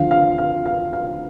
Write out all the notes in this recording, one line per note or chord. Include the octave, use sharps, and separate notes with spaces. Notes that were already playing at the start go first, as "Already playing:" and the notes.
Already playing: D2 D3 F3 F5
F5
F5
F5
F5